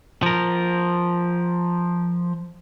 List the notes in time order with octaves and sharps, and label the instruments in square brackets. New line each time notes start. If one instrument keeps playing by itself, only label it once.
[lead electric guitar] F3 A#4